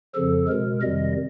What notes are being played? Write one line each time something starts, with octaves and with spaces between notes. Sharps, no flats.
F2 C#3 F3 A4
B2 G#3 A#4
F2 C3 D#3 G3 D#5